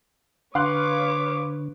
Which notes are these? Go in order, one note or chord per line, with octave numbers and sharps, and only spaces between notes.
D3 B4 C#5 F5 C6 D6 F#6